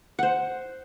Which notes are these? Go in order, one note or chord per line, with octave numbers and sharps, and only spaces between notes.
C5 F#5